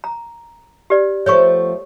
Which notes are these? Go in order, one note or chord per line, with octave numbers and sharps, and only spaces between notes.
A#5
G4 B4 D5
F3 A3 B3 C#5 C#6